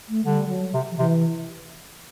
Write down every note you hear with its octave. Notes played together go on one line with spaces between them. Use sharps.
A3
D3 G3
F#3
C3
F3
C3 E3